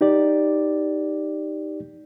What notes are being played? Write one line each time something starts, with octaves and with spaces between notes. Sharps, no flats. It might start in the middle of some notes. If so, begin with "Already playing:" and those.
D#4 G4 D5